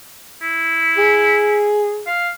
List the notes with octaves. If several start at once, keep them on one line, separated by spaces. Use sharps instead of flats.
E4
G#4
F5